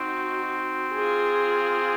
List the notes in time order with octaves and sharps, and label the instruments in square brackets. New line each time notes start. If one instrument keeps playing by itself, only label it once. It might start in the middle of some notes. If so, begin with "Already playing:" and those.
Already playing: [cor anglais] C4 [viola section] D#4 F#4
[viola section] F4 G#4